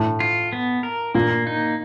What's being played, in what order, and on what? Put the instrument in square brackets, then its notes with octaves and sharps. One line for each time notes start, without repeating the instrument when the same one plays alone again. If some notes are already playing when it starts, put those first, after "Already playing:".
Already playing: [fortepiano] A2
[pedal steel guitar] F4
B3
A#4
[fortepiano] A#2 [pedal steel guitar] A#3
[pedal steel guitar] D#4